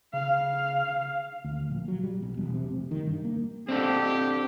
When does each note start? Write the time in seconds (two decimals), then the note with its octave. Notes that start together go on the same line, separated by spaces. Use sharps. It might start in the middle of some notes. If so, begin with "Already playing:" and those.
0.14 C#3 F5
1.45 D2
1.70 A#1
1.88 F#3
2.03 G3
2.22 B1
2.37 E1
2.54 C3
2.70 F1
2.91 D#3
3.06 G2
3.25 A#3
3.69 C4 D4 G4 A4